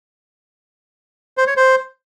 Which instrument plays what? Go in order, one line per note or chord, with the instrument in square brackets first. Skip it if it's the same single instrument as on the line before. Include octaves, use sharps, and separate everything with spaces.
[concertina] C5
C#5
C5